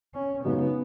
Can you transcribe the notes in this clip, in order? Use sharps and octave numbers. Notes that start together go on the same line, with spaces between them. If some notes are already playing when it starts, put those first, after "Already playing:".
C#4
F#2 C#3 G#3 B3 D#4